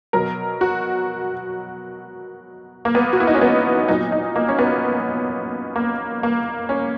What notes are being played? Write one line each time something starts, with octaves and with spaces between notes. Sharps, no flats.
B2 F#3 A#4
F#4
A#3
B3
F#4
E4
D#4
C#4
B3
A#2 F#3 D#4
D#4
A#3
C#4
B3
A#3
A#3
C#4